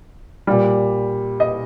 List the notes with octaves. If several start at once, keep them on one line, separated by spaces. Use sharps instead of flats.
A#2 G3
D#5